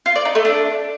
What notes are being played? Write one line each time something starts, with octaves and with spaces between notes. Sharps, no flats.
F4
D5
D#4
A3
D4